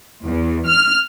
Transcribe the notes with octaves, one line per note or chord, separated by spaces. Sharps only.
E2
F6